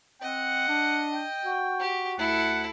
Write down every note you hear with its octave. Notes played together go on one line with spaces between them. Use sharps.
C4 D#5 F#5
D4
G5
F#4
G4
D2 E4 A4 F#5